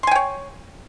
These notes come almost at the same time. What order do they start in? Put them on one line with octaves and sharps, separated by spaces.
C6 G#5 G5 C#5